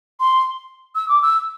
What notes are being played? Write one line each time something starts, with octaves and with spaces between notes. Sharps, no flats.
C6
E6
D6
E6